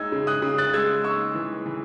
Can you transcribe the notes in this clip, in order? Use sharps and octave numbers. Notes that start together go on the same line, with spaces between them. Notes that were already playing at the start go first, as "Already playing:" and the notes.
Already playing: G#3 D#4 E6 G#6
C#3
D#6 F#6
C#3
F#6 A6
G#3 E6 G#6
D#4 C#6 E6
E3
E3